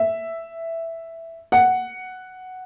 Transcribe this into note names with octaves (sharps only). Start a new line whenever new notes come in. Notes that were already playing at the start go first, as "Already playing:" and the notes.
Already playing: E5
F#5